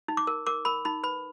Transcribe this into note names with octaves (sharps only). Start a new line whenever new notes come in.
D#4
D6
A#4
A#4 D6
A#4 B5
D#4 B5
B4 B5